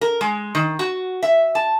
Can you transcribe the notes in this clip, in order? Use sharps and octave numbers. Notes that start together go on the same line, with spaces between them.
A#4
G#3
D#3
F#4
E5
A5